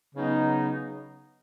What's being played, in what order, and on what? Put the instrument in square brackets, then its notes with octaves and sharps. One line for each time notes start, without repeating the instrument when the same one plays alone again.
[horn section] C#3 F#3 B3 D#4